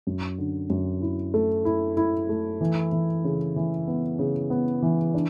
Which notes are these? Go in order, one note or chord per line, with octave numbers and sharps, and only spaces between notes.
F#2
D3
F#2
E4
A3
E4
E4
A3
E3
E3
C#3
E3
B3
C#3
B3
E3
D4